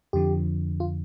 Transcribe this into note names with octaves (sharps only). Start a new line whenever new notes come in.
F2 D3 F3 G4
F4